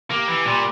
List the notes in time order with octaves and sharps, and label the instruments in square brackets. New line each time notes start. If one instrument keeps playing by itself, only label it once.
[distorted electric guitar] A#3 [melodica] G4
[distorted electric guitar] E3
[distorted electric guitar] A#2 [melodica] G3